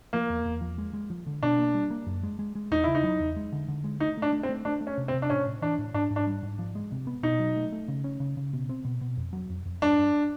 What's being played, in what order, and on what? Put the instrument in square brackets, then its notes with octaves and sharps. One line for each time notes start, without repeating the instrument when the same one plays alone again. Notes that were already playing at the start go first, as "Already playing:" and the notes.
[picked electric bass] F3 [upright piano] A#3
[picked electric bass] E2
E2
F3
G#3
G#3
F3
D3
[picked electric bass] B2 [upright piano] D4
[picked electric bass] A#3
G3
A#3
F#2
G#3
G#3
G#3
[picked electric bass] E2 [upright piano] D#4
[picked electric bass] C#3 [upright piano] E4
[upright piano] D#4
[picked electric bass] F#3
E2
G#3
D3
D3
G#3
[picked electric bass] A3 [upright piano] D#4
[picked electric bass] A3 [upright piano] D4
[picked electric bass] A3
[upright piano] C4
[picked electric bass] A3
[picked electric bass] A3 [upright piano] D4
[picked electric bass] A3
[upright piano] C#4
[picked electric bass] C3
[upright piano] C4
[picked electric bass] C3
[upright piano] D4
[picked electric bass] A2 [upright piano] C#4
[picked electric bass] A2
[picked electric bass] E3 [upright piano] D4
[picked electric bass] A2
[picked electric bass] G#2 [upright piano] D4
[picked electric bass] G#2
[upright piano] D4
[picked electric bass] G3
G#2
F3
G#3
C3
B3
[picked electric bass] B2 [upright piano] D#4
[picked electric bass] F#3
A3
A3
C#3
C#4
C#3
C#3
B2
C4
B2
B2
F2
F#3
F2
F2
[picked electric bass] G2 [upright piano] D4
[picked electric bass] G2